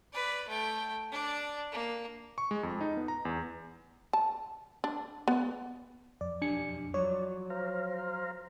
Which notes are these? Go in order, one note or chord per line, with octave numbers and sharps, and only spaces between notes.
B4 D5
A3 G5
D4 D5
A#3
C#6
G#3
F2
D#4
B3
A#5
E2
A5
D4
B3
F2 D5
B1 D4 G4 G#5 C#7
F3 F#3 C#5 D5
C5 F5 A#5